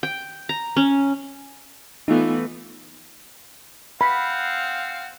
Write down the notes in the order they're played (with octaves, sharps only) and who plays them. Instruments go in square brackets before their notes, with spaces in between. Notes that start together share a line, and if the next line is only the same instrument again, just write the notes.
[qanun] G5
A#5
C#4
[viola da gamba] E3 A3 B3 [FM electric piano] D#4 F4
[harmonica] C4 F5 F#5 [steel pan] B5